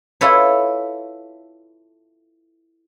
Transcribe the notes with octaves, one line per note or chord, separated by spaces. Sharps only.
E4 F4 A4 B4 C#5